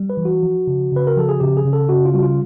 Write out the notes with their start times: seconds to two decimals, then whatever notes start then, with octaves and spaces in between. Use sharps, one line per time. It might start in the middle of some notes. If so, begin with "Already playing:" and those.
Already playing: G3
0.10 B4
0.17 E3
0.25 F#4
0.43 F3
0.67 C#3
0.92 C#3 B4
1.07 A#4
1.16 F3 A4
1.29 G#4
1.40 C#3 G4
1.57 G#4
1.65 C#3
1.73 A4
1.89 C#3 F#4
2.06 F4
2.14 G3 F#4
2.23 F4